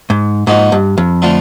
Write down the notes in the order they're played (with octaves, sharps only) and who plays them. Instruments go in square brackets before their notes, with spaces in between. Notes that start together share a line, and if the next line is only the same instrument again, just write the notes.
[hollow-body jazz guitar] G#2
[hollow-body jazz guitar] G#2 [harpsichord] F3 A#3 D#4 F#4
[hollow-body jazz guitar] G2
F2
[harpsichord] D3 F3 A3 D4 F4